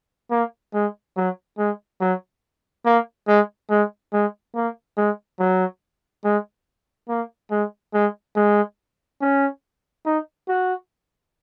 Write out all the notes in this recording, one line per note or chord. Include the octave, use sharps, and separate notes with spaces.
A#3
G#3
F#3
G#3
F#3
A#3
G#3
G#3
G#3
A#3
G#3
F#3
G#3
A#3
G#3
G#3
G#3
C#4
D#4
F#4